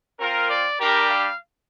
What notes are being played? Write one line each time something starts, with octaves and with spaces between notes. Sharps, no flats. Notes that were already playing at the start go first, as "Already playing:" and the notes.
C4 F4 A#4
D5
G3 D4 G4 A#4
F5